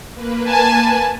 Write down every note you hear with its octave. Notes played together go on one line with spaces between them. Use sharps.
A#3 B4
G#5 A5